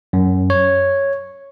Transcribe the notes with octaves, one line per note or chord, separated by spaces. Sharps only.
F#2
C#5